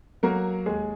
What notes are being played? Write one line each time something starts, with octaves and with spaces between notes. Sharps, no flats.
F#3 A#3 A#4
D#2 G#3 G#4